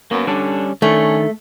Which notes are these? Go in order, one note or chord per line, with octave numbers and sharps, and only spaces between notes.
F#2 A#3 B3
D3 G3 C#4 D4
D#3 A3 C#4 D4